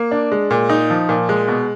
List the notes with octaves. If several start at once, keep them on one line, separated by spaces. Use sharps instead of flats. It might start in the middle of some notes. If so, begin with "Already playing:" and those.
Already playing: A#3
D4
G#3
A#2
D#4
F3
A#2
G#3
B2